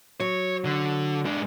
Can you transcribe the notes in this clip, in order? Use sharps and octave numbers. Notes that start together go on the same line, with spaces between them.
F#3 C#5
D3
G#2 D4